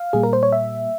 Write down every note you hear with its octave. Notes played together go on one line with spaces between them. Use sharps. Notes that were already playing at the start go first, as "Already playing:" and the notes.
Already playing: F5
A#2 G3 A#3 G#4
A#4
C5
C#5
E5